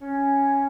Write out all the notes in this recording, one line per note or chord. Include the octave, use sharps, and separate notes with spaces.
C#4